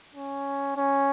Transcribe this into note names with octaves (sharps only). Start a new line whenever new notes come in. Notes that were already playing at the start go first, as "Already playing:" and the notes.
C#4
C#4